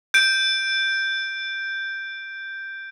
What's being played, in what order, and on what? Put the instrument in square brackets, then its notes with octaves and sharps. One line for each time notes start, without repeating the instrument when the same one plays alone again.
[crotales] G6 D7